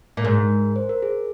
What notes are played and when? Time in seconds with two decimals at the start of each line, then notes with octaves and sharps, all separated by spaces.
0.17 A#2
0.24 G#2 A#4
0.76 C5
0.89 A#4
1.02 G#4